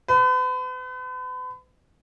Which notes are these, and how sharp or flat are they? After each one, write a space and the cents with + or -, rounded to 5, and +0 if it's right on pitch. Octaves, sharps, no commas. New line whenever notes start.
B4 +40